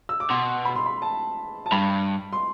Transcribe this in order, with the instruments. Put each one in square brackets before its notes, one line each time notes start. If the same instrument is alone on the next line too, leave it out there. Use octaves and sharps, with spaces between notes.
[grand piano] E6
D6
[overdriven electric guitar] B2 [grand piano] C6
[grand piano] B5
C6
B5
A5
A5
[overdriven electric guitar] G2 [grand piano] B5
[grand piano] C6